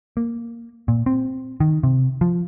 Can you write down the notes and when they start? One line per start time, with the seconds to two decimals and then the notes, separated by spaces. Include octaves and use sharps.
0.17 A#3
0.88 A#2
1.06 C4
1.60 D#3
1.83 C3
2.21 F3